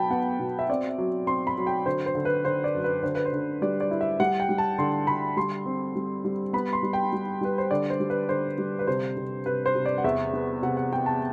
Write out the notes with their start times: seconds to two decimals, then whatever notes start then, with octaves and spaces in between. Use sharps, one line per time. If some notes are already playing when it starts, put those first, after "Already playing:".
Already playing: B2 F#3 G5 A5 B5
0.10 B3 F#5
0.39 B2
0.59 E5
0.69 C4 D5
0.89 E5
0.98 F#3
1.27 C4 C6
1.47 B5
1.58 F#3
1.67 G5
1.86 D3 C5
2.06 C5
2.15 D3
2.25 B4
2.45 D3 C5
2.64 D5
2.74 F#2
2.84 B4
3.03 D3 C5
3.15 B4
3.25 C5
3.33 D3
3.62 G3 D5
3.81 D5
3.91 E4
4.01 E5
4.20 G3 F#5
4.40 G5
4.49 G3
4.58 A5
4.78 D3 C6
5.07 D3 B5
5.37 G3 C6
5.66 C4
5.95 G3
6.25 G3
6.53 B3 B5
6.73 C6
6.83 G3
6.93 G5
7.13 G3
7.41 G3 B4
7.58 C5
7.71 D3 D5
7.90 C5
8.00 G3
8.10 B4
8.29 D3 C5
8.58 G3
8.79 B4
8.87 C3 C5
9.17 C3
9.46 C3 B4
9.66 C5
9.75 C3
9.86 D5
9.98 F#5
10.04 E2 E5
10.33 B3
10.63 C3 F#5
10.77 F#5
10.92 B3 G5
11.06 A5